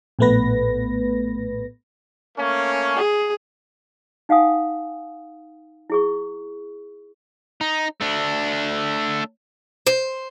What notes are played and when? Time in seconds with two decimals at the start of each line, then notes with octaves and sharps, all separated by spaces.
0.19 A#1 A2 A3 B3 B4 A#6
2.37 A3 A#3 C#4
2.96 G#4
4.29 D#4 F5 F#5 G#5 D#6
5.90 E4 G#4 C#6
7.61 D#4
8.01 A3 D4
9.87 C5